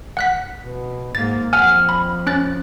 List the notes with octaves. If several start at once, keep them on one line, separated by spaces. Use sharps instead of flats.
F#5 F#6 B6
B2
G#2 A#3 A6
F2 F#5 G#5 F6
B5
C#4 F#6 A6